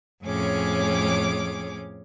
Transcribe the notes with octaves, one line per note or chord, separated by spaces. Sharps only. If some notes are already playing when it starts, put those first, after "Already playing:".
F2 A2 C#4 G#4 C#5 D6